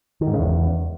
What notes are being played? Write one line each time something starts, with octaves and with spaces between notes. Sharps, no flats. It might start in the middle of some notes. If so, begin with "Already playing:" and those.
D#3
G#2
C#3
E2